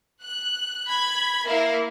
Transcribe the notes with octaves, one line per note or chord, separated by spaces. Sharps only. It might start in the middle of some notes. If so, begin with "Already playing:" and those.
F#6
B5 G#6
A#3 E4 A#4 F5